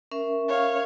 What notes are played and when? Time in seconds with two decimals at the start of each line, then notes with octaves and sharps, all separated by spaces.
0.12 C#4 A#4 E5
0.49 C#5 F5